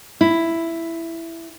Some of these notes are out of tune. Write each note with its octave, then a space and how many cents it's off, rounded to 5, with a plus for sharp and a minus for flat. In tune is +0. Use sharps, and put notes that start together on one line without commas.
E4 +5